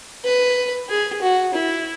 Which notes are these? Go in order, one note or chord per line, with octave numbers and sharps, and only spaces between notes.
B4
G#4
F#4
E4